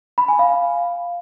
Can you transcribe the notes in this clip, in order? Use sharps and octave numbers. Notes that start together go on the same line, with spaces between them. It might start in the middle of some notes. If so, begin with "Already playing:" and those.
B5
G#5
F5